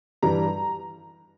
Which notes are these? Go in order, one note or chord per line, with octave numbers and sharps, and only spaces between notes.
G2 E3 G3 A#5